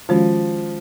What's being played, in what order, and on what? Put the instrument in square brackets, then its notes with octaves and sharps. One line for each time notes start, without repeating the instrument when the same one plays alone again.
[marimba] D#3 G#3 C#4 F#4 [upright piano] F3